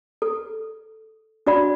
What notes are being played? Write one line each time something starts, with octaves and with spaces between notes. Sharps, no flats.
A4
D4 F#4 D5 F#5 B5